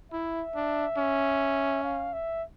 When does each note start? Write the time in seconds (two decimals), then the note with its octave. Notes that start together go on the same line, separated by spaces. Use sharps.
0.12 E4 E5
0.56 D4
0.98 C#4
1.84 F5
2.13 E5